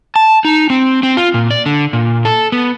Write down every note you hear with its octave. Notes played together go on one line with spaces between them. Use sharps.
A5
D#4
C4
C4
F4
A#2
D5
D3
A#2
A4
B3